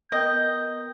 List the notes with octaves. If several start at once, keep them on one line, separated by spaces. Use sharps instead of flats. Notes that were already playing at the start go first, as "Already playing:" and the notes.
B3 A#4 D#5 G5 G6